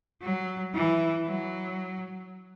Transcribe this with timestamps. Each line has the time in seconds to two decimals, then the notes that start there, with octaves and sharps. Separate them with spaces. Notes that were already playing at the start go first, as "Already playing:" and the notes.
0.22 F#3
0.74 E3
1.26 F#3